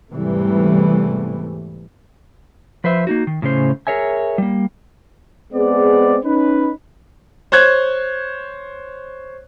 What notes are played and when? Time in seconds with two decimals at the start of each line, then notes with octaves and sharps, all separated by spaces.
0.13 E2 G#2 C3 E3 G3 A3
2.84 F3 B4 C5 E5
3.07 A#3 D#4 F#4
3.27 D#3
3.42 A2 C#3 C#4 C5
3.87 G#4 A#4 C#5 E5 G#5
4.38 G3 A#3
5.53 G#3 B3 C4 G#4 D5
6.24 C#4 D#4 B4
7.52 C5 C#5 F#6 G#6